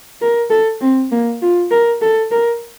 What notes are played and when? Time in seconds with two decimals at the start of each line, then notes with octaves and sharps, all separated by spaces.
0.21 A#4
0.50 A4
0.81 C4
1.12 A#3
1.42 F4
1.71 A#4
2.02 A4
2.31 A#4